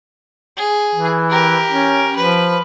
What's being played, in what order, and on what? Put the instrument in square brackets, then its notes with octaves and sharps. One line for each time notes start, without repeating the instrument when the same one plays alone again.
[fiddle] G#4
[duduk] E3
[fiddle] G4 A#4
[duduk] C#4
[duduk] F3 [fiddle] B4